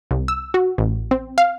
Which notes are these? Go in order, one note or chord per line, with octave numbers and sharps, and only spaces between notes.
C2
E6
F#4
A1
C4
F5